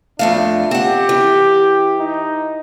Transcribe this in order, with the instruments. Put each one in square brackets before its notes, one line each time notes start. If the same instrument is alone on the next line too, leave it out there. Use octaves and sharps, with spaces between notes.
[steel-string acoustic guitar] F2 A3 F5 [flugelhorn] D4
[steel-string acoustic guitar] C4 F#5 [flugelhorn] G4
[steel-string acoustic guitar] E3
[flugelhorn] D#4